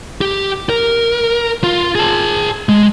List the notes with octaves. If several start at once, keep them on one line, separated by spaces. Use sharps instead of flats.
G4
A#4
F4
G#4 A5
G#3